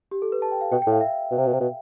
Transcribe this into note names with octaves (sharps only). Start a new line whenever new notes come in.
G4
A4
B4
A5
G5
F5
B2 G5
G5
A2
F5
E5
B2
C3
B2
C3
B2